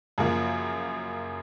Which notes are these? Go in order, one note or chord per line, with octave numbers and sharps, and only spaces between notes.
F#2 C#3 F3 A#3